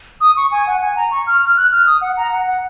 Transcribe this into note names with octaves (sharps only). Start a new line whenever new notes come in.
D#6
C#6
G#5
F#5
G#5
A#5
C#6
F6
F6
F#6
F6
D#6
F#5
A#5
F#5
F#5